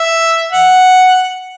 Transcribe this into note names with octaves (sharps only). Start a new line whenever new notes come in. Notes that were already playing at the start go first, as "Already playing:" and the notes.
Already playing: E5
F#5